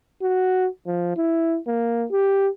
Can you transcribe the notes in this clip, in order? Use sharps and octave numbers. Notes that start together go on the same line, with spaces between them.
F#4
F3
E4
A#3
G4